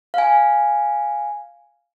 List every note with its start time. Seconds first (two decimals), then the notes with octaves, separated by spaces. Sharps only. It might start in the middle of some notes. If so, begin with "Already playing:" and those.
0.14 F5 G#5